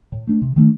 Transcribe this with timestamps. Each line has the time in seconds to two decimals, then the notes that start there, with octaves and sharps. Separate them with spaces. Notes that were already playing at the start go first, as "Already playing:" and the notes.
0.12 A2
0.27 A3 D4
0.42 C3
0.56 D#3 A3 D4